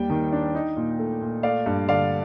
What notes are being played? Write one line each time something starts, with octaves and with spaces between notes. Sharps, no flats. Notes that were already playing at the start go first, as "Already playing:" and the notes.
Already playing: D#2 G3 G5
D#3
D4
D#4
A#2
A3
A#2
A3 D5 F5
G2
D3 D5 F5